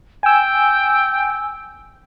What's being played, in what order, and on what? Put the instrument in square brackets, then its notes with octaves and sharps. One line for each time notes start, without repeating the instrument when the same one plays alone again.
[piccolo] G5 [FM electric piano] G#5 E6